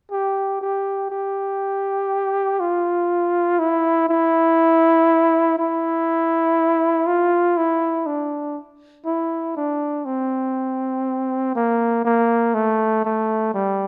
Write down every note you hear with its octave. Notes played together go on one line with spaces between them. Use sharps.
G4
G4
G4
F4
E4
E4
E4
F4
E4
D4
E4
D4
C4
A#3
A#3
A3
A3
G3